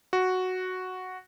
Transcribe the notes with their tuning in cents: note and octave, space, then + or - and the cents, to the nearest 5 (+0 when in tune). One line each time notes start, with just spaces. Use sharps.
F#4 +0